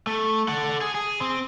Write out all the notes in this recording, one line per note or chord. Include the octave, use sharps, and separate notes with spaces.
A3
A4 F#5
G#4
G#4
C4